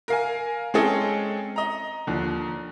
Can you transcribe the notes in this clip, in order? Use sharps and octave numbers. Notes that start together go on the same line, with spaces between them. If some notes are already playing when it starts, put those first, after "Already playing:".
A#4 F5 G#5
G#3 C4 C#4 G#4 A4 D#5
D#5 A#5
D#2 D3 F3